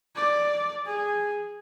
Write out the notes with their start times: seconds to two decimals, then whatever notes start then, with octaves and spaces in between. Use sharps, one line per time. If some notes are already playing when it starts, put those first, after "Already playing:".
0.16 D5
0.86 G#4